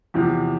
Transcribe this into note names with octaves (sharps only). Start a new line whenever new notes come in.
E2 C3 F3